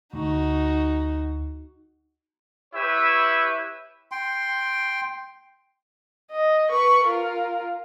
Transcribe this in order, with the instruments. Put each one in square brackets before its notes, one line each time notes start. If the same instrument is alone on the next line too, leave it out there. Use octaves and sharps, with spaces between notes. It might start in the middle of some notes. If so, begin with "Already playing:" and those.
[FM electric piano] D2 [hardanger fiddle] D#4 F#4
[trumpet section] E4 G4 B4 C#5 E5
[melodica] G5 C6
[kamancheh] D#5
B4 C#6
F4 A#4